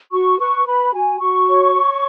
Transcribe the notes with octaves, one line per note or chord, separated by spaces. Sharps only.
F#4 C#6
B4 C#6
B4 B5
F#4 G#5
F#4 C#6
C#5
C#5